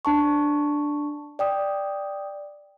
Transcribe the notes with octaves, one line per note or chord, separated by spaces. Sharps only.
D4 A5 C#6
D5 G5 D#6